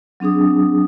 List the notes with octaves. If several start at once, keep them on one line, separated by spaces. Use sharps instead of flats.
F#3 C4 D4 G#4 D#6